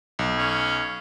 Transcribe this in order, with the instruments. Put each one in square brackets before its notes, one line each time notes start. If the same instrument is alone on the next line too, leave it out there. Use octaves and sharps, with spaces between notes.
[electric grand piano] B1
[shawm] C#4